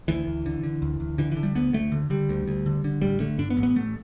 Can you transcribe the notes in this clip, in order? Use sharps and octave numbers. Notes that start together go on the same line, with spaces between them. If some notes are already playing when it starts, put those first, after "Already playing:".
D2 E3
D2
D3
D3
D2
D2
D3 E3
E3
D3
G3
D2 B3
D2 A3
D3
D3 G3
D2
D2
D3
D3
A1 G3
D3 A3
G2 D4
B3
A1
B3
A1 A3